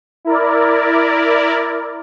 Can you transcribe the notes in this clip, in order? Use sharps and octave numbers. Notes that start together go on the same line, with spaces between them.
E4 A#4 D5